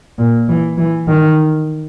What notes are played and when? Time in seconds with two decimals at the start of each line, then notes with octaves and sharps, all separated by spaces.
0.18 A#2
0.48 E3
0.78 E3
1.08 D#3